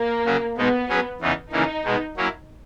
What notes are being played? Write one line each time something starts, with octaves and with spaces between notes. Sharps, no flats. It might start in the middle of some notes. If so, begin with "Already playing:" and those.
Already playing: A#3
C#3 F#3 C#4 F#4
B2 G#3 B3 D#4
F#3 C#4 G#4 B4
E2 C#3 E3 B3 D#4
C#3 E3 A#3 C#4 D#4
B2 G#3 B3
F#3 A#3 C#4 E4